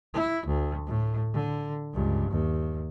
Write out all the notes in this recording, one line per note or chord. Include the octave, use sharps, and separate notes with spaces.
E4
D2
A2
D3
C#2 G2
D#2